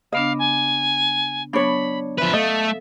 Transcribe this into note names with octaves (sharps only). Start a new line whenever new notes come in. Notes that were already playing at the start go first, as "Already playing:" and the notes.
C#3 B3 D4 D#5 F5
G#5
F#3 B3 D4 C#5 B5
F3 B4 E5
A3 A4 D#5 F5